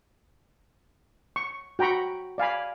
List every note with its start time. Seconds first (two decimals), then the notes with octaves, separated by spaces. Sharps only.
1.36 C#6
1.79 F#4 G5 A#5 B5 C#6
2.38 D5 F5 G#5 B5